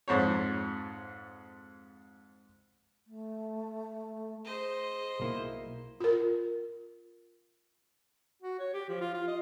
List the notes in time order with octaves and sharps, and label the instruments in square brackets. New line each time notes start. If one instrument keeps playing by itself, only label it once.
[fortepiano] F2 G#2 C5 C#5
[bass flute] A3
[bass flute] G#4 [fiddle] C5 D#5
[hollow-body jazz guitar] B1 A#3 E4
[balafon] F4 A#4
[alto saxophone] F#4
C#5
G4
F3
F4
F4
D#5